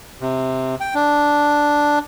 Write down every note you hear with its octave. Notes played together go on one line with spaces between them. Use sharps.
C3
G5
D4